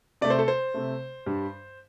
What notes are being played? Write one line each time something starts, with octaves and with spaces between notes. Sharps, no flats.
C3 A3 D5
C5
A4
C5
C3 A3
G2 G3